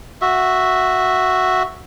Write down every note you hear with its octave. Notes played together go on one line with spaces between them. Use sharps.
F#4 E5